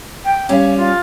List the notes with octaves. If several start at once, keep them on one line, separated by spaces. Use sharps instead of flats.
G5
G3 C#4 F5
F4